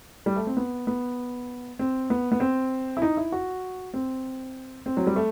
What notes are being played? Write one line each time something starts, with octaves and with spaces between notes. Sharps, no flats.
G3
A3
C4
B3
B3
C4
B3
B3
C4
E4
D#4
E4
F#4
C4
C4
F#3
G3
A3